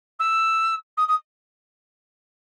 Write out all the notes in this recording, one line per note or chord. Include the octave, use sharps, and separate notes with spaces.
E6
D#6
D#6